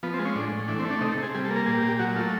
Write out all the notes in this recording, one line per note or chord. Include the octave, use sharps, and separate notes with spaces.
F3 B3
C4
G#3
C#4
A2 D4
A2
E3 D4
C4
A3
D4
C3 D#4
A4
C3 G#4
G3 G#4
A4
A#3
A#4
A#2 G#4
G4
A#2
G4
F#3 F#4
A3 F4